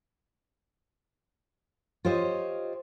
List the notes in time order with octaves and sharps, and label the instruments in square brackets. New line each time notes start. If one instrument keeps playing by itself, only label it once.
[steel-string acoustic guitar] F4 G4 C5 C#5 D#5